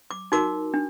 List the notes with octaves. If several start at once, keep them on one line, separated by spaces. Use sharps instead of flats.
D6
D#4 F#4 A#4 D6
D4